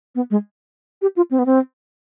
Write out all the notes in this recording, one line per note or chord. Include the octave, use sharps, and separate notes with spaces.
B3
G#3
G4
F4
C4
B3
C4